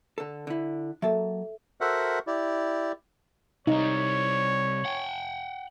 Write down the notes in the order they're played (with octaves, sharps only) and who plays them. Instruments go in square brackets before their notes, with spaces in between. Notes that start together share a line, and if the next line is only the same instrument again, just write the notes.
[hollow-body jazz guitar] D3 A4
D3 E4
[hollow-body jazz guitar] F#3 A#3 A5 [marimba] A4 E5
[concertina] F#4 A4 A#4 C5 E5 F#5
E4 G4 D5
[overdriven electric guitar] C3 G3 [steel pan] D#4 [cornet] C#5
[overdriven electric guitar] F#5 G5